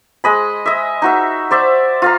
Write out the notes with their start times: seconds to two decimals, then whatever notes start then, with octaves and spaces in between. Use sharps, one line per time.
0.24 G#3 D#5 B5
0.66 D#5 E5
1.02 D#4 F#4 E5
1.51 C5 D5 E5
2.02 F4 F5 A#5